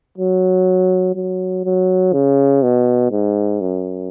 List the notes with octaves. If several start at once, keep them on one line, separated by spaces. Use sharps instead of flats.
F#3
F#3
F#3
C#3
B2
G#2
F#2